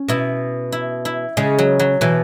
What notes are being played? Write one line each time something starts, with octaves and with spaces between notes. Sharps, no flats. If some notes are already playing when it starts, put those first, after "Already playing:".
Already playing: C#4
B2 E4
E4
E4
C#3 G#3
F#3
F#3
B2 E3